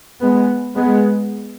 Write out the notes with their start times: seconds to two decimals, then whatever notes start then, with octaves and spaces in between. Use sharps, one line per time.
0.21 G#3 B3
0.75 G#3 B3